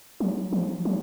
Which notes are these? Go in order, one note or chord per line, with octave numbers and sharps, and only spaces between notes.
F#3
F3
F#3